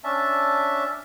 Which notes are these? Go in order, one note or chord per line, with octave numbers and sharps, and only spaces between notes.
C#4 D4 E5 A5